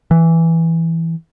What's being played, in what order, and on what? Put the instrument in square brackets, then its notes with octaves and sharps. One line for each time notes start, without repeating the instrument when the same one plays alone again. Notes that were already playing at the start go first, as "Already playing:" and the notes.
[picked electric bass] E3